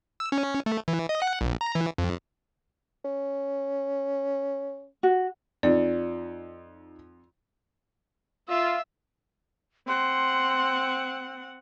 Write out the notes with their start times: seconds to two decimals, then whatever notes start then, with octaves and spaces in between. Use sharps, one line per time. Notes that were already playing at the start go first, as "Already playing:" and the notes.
0.20 E6
0.32 C#4
0.66 A3
0.88 E3
1.09 D#5
1.22 F#5
1.41 A#1
1.61 A#5
1.75 E3
1.98 F2
3.05 C#4
5.03 F#4
5.63 F2 D#4 F4 D5
8.49 F4 E5
9.87 C4 F#5 C6